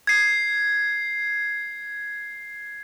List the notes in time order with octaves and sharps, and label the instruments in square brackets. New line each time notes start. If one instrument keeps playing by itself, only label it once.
[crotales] G#6 C7